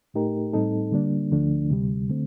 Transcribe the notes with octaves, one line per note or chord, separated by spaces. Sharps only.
A2 A3 D#4 G4 A#4
A2 G3 C4 D#4 A4
D3 G3 A#3 D4
D2 D3 F3 A3 D4
D2 C3 G3
D3 A3 C4